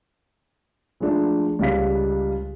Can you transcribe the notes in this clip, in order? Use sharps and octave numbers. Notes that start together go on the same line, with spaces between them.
F3 G#3 A3 D4
C#2 G3 F5 B6